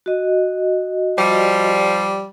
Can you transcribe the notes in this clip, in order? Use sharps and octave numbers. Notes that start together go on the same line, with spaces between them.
F#4 D#5
F3 G3